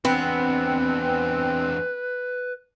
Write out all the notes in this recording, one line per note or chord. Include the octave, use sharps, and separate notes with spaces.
E2 B3 C4 D4 B4